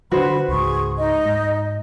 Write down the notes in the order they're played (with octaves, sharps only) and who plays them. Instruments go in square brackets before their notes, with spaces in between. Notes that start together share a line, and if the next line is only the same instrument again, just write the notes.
[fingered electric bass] D3 E3 [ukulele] F#4 C5 [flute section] B4 B5
[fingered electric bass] C#2 G#2 [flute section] G#4 C#6
[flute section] D#4 D#5
[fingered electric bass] G#2